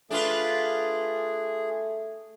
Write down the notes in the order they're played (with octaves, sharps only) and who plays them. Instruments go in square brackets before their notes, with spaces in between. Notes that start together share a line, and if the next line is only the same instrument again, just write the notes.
[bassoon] A3 [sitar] D4 F4 B4 [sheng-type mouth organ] G#4